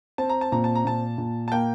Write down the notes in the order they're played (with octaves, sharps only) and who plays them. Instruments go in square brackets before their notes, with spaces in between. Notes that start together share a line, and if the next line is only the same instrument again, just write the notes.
[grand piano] C4 [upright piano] A5
[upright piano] A#5
A5
[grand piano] A#2 [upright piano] A#5
[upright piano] A5
A#5
[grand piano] A#2 [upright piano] A5
[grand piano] A#2
[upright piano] A5
[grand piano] A#3 [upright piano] G5